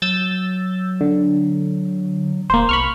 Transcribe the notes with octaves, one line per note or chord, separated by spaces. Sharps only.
F#3 E6 G6 A6
D3
D#1 A#3 C5
C2 B5 C#6 F6